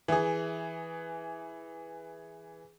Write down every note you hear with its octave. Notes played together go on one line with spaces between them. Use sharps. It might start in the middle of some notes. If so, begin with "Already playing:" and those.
E3 G#4